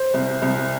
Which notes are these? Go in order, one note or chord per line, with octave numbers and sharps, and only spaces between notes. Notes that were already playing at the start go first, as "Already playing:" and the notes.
Already playing: C5
C2
C2